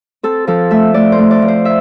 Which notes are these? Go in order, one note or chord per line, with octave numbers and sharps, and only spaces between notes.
C4 A4
F3 A4
A3 E5
A3 D5
C5
A3
D5
F3
C5
E5